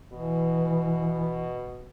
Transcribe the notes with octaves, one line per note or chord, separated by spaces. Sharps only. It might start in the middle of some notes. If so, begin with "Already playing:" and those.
B2 E3